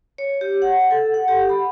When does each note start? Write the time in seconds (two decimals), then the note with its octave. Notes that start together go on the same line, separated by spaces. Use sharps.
0.18 C#5
0.41 G4
0.62 F#5
0.91 A4
1.14 F#5
1.28 G4
1.49 B5